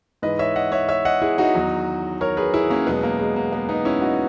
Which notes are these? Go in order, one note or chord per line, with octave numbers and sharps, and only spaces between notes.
G#2 E3 B4 D#5
C#5 E5
D#5 F#5
C#5 E5
C#5 E5
D#5 F#5
E4 G#4
D#4 F#4
E2 D#3 F#3
A#4 C#5
G#4 B4
E4 G#4
A#3 C#4
E2 B2 F#3 G#3 B3
A#3
G#3
A#3
G#3 B3
B3 D#4
C#4 E4
D#4 F#4